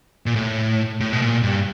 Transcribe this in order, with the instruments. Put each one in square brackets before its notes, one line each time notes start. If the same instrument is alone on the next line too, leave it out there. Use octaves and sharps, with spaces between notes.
[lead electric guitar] A#2
A2
A2
B2
A#2
G2